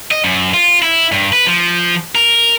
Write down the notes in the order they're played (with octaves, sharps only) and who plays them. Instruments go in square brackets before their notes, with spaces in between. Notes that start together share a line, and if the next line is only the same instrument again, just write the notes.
[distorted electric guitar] D#5
F#2
F4
E4
G2
B4
F3
A#4